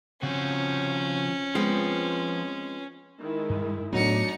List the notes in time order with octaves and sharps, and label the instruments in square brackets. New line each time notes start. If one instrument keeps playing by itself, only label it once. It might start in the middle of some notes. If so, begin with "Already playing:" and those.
[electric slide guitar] C#3 C4 [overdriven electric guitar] F3 F#4 [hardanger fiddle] C#4
[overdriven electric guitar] F3 [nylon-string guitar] G#3 B3 C4 [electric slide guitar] F4 B4 G5
[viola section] D#3 G#3 E4
[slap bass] G2
[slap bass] A2 B3 [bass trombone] F#3 [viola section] A3 D4 [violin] D#4 C#7